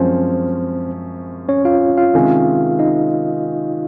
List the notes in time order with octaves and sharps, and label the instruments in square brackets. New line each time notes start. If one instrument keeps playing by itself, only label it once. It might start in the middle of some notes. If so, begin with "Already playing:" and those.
Already playing: [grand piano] F#2 F3 G#3 C#4 [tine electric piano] C4 C5
[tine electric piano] C#4 C#5
F4 F5
F4 F5
[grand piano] C3 D#3 G#3 C#4
[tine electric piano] D#4 D#5